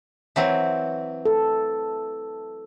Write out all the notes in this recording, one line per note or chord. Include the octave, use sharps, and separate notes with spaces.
E3 F#3 C4
A4